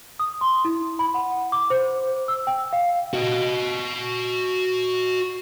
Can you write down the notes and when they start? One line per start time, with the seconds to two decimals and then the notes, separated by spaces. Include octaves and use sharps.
0.19 D#6
0.41 C6
0.65 E4
0.99 B5
1.14 F#5
1.52 D6
1.70 C5
2.28 E6
2.47 G5
2.73 F5
3.14 F#4 D#5